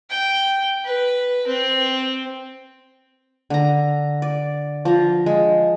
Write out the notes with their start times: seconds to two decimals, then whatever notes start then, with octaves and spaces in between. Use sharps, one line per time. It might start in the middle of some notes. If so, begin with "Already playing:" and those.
0.10 G5
0.85 B4
1.47 C4
3.50 D3 A#5
4.22 D5
4.85 F3 A#5
5.26 G#3